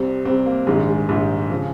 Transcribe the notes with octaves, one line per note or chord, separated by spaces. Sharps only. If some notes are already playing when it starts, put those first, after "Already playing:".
Already playing: C2 C3 G3 C4
C2 C3 G3 C4
A#3
A#1 G#2 D#3 G3 G#3
G#3
A#1 G#2 D#3 G3
C#3 F3